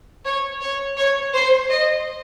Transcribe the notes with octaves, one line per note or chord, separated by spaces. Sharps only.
C#5
C#5
C#5
C5
D#5